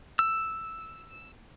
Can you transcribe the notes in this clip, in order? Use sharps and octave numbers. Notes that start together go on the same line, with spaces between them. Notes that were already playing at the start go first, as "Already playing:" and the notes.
E6